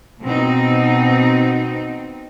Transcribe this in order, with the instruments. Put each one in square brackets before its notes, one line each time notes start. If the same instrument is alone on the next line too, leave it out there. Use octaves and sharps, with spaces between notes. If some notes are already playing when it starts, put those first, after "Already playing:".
[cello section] B2 C4 D#4